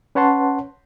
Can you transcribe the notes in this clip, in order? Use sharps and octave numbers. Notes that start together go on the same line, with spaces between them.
C#4 B4 C#5 F#5 A5 C6